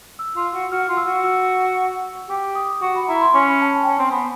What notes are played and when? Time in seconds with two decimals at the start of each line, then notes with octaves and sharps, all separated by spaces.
0.19 E6
0.36 F4
0.54 F#4
0.72 F#4 F6
0.89 F4
0.97 E6
1.07 F#4
1.24 E6
2.30 G4 D6
2.55 D#6
2.81 F#4 C#6
2.95 B5
3.08 E4 A#5
3.21 C6
3.34 C#4 C#6
3.47 B5
3.61 A5
3.74 A5
3.83 G5
3.87 C#4 G#5
3.98 C4
4.11 B3